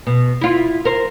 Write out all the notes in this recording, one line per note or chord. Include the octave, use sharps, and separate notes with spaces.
B2
E4 F4
A#4 C5